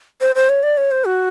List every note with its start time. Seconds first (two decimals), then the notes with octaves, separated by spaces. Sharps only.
0.21 C5
0.35 C5
0.49 C#5
0.63 D5
0.77 C#5
0.91 C5
1.05 F#4